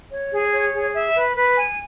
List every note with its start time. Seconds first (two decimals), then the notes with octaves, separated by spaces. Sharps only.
0.11 C#5
0.32 G#4
0.53 C#5
0.74 G#4
0.94 E5
1.15 B4
1.36 B4
1.56 G#5